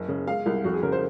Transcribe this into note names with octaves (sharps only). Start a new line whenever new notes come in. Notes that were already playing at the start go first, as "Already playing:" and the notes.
Already playing: F#1
C#3
G#3 F5
C2
F2 F#4
G#4
C#3 A#4
C5